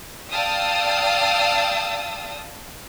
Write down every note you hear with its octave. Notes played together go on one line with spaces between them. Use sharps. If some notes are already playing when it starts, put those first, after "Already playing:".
D5 F5 G5 A5 D#6 E6